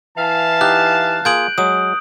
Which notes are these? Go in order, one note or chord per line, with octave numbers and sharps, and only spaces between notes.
E3 F5 A5
D#4 G4 F#6
A#3 F4 G#4 G6 D7 F#7
F#3 G#3 D#6